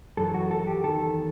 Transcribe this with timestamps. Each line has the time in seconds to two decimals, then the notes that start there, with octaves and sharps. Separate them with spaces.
0.17 F#2 E3 A4
0.34 F#4
0.51 A4
0.67 G4
0.83 E2 D#3 A4